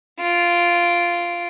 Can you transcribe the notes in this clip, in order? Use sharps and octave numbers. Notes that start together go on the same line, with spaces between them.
F4 D7